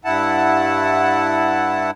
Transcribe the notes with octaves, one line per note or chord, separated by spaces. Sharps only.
G2 E4 F#5 A5